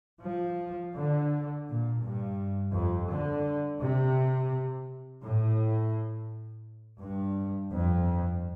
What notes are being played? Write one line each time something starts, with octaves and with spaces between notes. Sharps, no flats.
F3
D3
A#2
G2
F2
D3
C3
A2
G2
F2